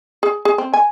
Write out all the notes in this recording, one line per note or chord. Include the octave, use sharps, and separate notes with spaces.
G#4
G#4
C4
G#5